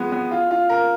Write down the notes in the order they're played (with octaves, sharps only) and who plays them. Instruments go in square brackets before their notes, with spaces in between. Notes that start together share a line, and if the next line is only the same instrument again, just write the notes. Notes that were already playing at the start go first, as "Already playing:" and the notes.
Already playing: [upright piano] F3 G#3 B3
B3
F4
F4
A#4